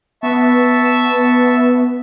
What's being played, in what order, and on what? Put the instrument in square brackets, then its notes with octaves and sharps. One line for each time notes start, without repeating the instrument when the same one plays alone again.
[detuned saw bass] B3 [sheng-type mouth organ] E5 A5 C#6